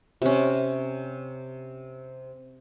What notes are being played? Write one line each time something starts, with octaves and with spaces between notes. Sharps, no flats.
C3 C#4